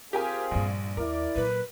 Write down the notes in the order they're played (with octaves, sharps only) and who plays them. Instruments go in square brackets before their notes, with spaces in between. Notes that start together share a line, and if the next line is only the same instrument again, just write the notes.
[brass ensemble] C4 F4 G#4 [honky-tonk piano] G4 A#4 G#5
[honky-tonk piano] A#1 [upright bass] G2 A#2
[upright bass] D#2 [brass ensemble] E4 D5 [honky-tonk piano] A#4
[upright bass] A#2 F#3 [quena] B4